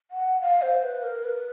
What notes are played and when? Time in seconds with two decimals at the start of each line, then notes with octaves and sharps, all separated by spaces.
0.11 F#5
0.41 F5
0.62 C5
0.83 B4
1.03 A#4
1.24 B4